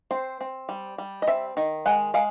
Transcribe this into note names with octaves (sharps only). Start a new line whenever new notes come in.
C4 C5
C4
G3
G3
D#5
C4 E5
D#3
G#3 F#5
G#3 F5